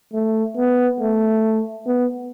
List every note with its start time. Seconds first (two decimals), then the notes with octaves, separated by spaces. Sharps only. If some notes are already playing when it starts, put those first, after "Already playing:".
0.14 A3
0.57 B3
1.01 A3
1.87 B3